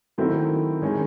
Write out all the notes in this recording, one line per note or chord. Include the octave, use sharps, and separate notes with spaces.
D#3 F#3 A3 C4 E4
D#3 G#3 C#4